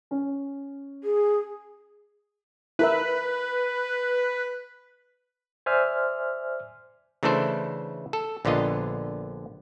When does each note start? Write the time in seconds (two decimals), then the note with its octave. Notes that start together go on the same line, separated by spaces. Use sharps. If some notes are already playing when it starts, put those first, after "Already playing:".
0.11 C#4
1.04 G#4
2.79 E4 A#4 B4 E5
5.66 C5 D5 E5 G#5 F6
7.23 C#3 E3 A3 D4 A4 C5
8.13 A4
8.45 A#1 D3 B3 F4 D#5